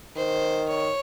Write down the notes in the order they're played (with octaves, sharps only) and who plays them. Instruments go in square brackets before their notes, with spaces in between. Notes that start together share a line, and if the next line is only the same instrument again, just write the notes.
[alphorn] D#3 [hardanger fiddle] C5
[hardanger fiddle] C#5